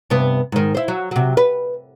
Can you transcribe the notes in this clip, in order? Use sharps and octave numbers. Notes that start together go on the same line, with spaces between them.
G2 C3 B3
G#2 D#3
E4 C5
F#3
C3 F#3
B4